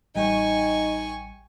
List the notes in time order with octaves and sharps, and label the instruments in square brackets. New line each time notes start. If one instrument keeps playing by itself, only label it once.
[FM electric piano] A1 G3 G5 [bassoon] D#4 [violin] G#5 C#6